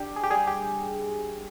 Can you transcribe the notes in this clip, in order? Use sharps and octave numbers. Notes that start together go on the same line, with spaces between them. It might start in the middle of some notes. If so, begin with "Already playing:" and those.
Already playing: D4 G4
G#4
G4
G3 G#4
G4